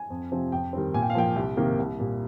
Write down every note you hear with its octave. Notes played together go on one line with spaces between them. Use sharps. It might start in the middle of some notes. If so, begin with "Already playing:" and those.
Already playing: G#5
F2
C3 F3 C4
F2 G5
D#3 G3 C4
A#2 G#5
G5
F5
F3 A#3 G5
C2
C3 D#3 A#3
C2
A#2 G3